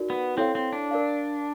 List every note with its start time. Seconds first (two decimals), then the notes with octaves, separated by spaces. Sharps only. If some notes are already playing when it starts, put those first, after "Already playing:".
Already playing: D#4 F#4 A#4 D5
0.10 B3
0.37 C4 E4 A4 C#5 F5
0.55 C4
0.73 D4
0.91 A#4 D5 F5